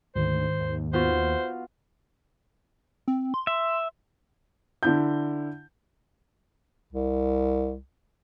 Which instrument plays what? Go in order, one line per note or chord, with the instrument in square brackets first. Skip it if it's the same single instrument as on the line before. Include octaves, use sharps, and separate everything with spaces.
[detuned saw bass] D2 [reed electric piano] G#2 D#3 [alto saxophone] C5
[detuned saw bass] D#2
[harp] B3 F4 F#4 [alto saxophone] C5
[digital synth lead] C4
C6
[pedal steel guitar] E5
[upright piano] D3 E4 G6
[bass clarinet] C2